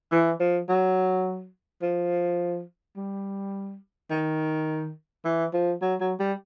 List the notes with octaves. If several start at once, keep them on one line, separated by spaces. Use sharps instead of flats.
E3
F3
F#3
F3
G3
D#3
E3
F3
F#3
F#3
G3